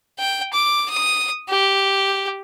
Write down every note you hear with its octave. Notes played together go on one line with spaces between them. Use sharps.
G5
D6
D#6
G4